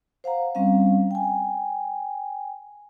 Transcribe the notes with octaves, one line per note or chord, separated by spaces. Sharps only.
C5 F5 F#5 A#5
G3 C4 C#4 F5
G5 G#5